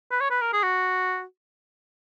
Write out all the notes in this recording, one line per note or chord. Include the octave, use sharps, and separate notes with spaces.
B4
C#5
B4
A#4
G#4
F#4